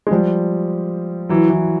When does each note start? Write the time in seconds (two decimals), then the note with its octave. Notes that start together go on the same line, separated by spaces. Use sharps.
0.07 G#3
0.11 F3 G3
1.29 E3 F#3
1.50 E3